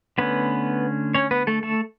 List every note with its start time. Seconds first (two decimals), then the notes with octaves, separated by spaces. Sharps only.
0.18 D3 A3 B3 C#4 B4
1.14 C#4 C#5
1.31 B3 B4
1.47 A3 A4
1.63 A3 A4